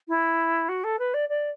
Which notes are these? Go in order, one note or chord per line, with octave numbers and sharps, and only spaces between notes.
E4
F#4
A4
B4
D5
D5